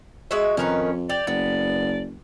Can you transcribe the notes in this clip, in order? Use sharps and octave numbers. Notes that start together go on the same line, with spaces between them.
G#3 F#4 E5
F2 D#3 C#4 A#4 B4
G4 D5
F#1 B3 D5